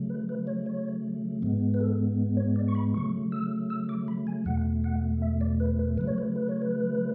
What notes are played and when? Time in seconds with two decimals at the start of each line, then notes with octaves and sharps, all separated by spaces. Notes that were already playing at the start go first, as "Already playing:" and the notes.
Already playing: C#3 F#3 A3
0.10 B4
0.29 B4
0.47 C#5
0.66 C#5
1.42 G#2 G#3 B3
1.74 B4
1.81 A4
2.37 C#5
2.56 D5
2.68 C#6
2.75 B5
2.94 C#3 F#3 A3 C#6
3.32 E6
3.70 E6
3.89 D6
4.08 B5
4.27 G#5
4.45 E2 B2 A3 F#5
4.84 F#5
5.22 E5
5.41 D5
5.60 B4
5.79 B4
5.97 C#3 F#3 A3 B4
6.07 C#5
6.18 B4
6.36 B4
6.49 C#5
6.62 B4